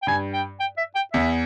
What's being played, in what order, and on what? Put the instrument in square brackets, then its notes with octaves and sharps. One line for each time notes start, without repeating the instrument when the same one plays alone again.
[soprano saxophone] G5
[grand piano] G2 [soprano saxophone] G#5
[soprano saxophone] G5
G5
E5
G5
[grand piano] E2 [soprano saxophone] E5